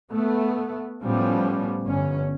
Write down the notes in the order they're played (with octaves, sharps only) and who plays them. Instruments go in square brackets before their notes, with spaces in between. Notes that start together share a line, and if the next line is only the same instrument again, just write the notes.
[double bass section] A3 B3
A2 F3 G3 B3 C#4
G1 C#4